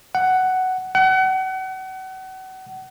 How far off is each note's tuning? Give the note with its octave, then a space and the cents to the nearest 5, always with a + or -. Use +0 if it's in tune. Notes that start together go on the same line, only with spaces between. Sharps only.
F#5 +10
F#5 +35